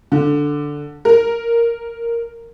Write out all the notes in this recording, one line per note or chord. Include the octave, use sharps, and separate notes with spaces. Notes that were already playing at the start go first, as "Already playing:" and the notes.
D3
A#4